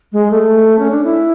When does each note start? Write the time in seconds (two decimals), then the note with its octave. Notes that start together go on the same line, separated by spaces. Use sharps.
0.13 G#3
0.31 A3
0.79 C#4
0.91 D4
1.04 E4